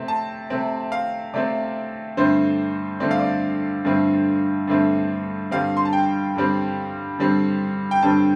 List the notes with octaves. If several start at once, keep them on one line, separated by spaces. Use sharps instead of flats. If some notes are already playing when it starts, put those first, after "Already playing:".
Already playing: C3 A3 C4
A5
C3 A3 C4
F5
C3 A3 C4 D5
G2 D3 A3 C4 C5
G2 D3 A3 C4 D5
F5
D5
G2 D3 A3 C4
G2 D3 A3 C4
G2 D3 G3 C4 F5
C6
A5
G5
G2 D3 G3 C4
G2 D3 G3 C4
G5
G2 D3 G3 C4 A5